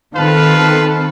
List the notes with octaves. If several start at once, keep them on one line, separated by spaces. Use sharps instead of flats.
D#3 C4 F4 A4 B4 F5